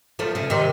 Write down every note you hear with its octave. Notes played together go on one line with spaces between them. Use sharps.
F3 A3
C#3 F3
C3 D#3